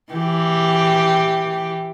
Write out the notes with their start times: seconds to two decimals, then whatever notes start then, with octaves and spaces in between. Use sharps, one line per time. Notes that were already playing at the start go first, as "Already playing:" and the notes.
0.13 E3 G4